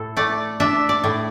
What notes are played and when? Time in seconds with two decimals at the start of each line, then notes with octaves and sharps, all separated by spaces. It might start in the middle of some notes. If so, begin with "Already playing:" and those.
Already playing: A2 A4
0.17 A3 D5
0.60 D4 E5
0.89 D5
1.04 A2